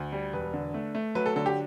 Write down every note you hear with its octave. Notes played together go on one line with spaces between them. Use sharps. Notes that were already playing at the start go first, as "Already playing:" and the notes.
Already playing: D2
G3
E1 B4
D3
A3
A3
F#3 B4
A4
D3 A4
G4